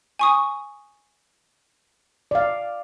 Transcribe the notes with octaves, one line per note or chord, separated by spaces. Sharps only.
G#5 C#6 D#6
D5 F5